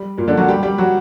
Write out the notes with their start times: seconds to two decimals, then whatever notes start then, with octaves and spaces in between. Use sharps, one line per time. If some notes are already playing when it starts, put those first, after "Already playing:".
Already playing: G3
0.18 A#2 A#3
0.28 D3 D4
0.37 F#3 F#4
0.48 G3 G4
0.63 G3 G4
0.78 F#3 F#4